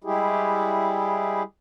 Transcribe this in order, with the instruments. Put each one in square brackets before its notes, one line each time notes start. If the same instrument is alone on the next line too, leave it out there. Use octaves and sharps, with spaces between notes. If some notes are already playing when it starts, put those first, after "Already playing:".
[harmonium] G3 G#3 E4 G4 G#4